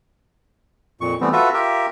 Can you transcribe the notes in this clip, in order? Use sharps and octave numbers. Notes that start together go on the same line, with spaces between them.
F2 A#2 C#6
E3 G3 A3 B3 C4
F4 F#4 A4 B4 E5
F4 G4 A#4 E5